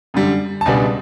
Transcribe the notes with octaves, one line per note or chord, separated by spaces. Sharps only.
F#2 D3 G3
A5
C#2 B2 G3 B3 D4 G#5